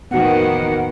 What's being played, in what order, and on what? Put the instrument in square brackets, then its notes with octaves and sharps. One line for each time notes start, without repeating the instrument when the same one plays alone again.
[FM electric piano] E2 A2 [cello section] D#3 F3 A#3 [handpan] B3 F#4 [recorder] F#5